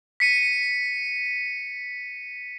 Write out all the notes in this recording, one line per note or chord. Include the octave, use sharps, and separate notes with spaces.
B6 C#7 D#7